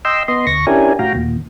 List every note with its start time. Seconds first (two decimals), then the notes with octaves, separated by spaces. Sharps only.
0.05 D#5 G5 C6 E6
0.28 B3 D#5 C6
0.47 D2 C#6 A#6
0.67 C#4 D4 E4 G4 A#4 G#5
0.99 A2 F#4 F5 G5 A#5
1.15 D#2 A#2